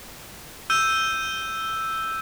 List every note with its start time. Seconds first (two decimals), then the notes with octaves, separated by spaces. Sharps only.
0.70 E6 G6 D#7